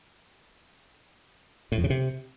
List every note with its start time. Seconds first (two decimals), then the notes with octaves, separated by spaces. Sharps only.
1.72 A2
1.78 F2
1.84 C#3
1.90 C3